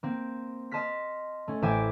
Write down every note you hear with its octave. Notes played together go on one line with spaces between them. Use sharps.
A#3 C4
D#5 A5 C6 F6 B6
A3 C#4
A1 C5 E5 G5 G#5 D6